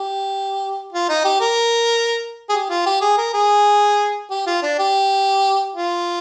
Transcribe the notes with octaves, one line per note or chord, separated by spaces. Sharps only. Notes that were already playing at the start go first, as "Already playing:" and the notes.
Already playing: G4
F4
D#4
G4
A#4
G#4
G4
F4
G4
G#4
A#4
G#4
G4
F4
D4
G4
F4